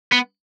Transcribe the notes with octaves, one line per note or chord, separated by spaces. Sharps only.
B3